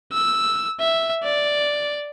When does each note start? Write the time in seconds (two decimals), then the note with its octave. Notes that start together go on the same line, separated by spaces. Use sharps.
0.12 E6
0.80 E5
1.23 D5